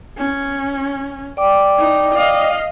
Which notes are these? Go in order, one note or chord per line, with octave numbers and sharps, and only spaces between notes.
C#4
D5 G5 D6
D#4
D#5 F5